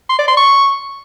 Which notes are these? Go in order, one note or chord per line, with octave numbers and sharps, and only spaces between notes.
C6
D5
C6
C#6